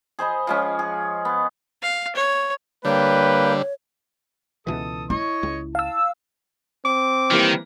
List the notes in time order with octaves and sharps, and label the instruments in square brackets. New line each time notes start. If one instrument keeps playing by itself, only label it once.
[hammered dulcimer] G#4 C5 D#5 B5
F3 G#3 C#4
G#4
B3
[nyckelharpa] F5
C#5
[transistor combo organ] D3 G3 [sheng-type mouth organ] A#3 G5 [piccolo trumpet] B4 [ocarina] C#5
[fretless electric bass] C#2 B2 E3 [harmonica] A4 D#6
[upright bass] E4 [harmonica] C#5 D#5 C#6
[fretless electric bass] C#2
[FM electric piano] F5 E6 [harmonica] A5
[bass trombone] C4 [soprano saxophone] D6
[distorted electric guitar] D#3 [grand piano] E3 G3 A#3